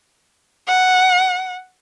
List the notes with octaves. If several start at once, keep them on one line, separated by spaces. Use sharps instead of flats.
F#5